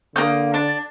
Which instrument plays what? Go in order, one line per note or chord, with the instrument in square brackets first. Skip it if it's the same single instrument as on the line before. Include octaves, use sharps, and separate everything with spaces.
[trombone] D3 [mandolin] A#3 D#6 G6
[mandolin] D4